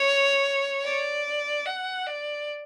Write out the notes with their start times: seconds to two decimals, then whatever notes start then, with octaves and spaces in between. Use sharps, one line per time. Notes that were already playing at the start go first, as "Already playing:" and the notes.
Already playing: C#5
0.85 D5
1.66 F#5
2.07 D5